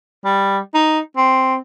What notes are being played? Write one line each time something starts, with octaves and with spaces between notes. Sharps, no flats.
G3
D#4
C4